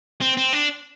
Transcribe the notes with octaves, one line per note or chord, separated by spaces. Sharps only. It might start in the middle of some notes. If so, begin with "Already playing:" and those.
C4
C4
D4